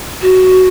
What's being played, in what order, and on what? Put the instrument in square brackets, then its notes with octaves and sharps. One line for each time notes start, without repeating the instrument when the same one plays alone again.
[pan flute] F#4